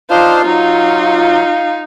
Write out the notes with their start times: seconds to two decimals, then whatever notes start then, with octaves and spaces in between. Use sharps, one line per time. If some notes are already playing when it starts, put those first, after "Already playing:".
0.10 D4 D#4 F4 C5 F5
0.45 F#3 D#4